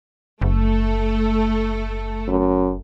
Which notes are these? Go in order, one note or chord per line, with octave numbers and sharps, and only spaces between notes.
F#1 A3 A4
F#2